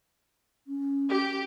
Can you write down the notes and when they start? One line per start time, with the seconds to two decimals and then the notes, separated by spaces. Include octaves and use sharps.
0.67 C#4
1.11 G4